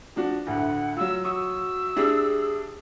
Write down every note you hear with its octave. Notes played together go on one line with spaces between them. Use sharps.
F3 D4 F#4
D2 A2 D3 F#5
F#3 F4 E6
F#4 C#6 D#6 E6
D4 E4 G4 G#4